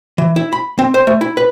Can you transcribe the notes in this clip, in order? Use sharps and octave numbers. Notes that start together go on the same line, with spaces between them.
E3
E4
B5
C4
C5
A3
E4
B4